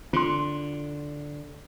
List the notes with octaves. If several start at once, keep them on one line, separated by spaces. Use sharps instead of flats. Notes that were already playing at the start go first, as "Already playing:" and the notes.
D3 F4 C6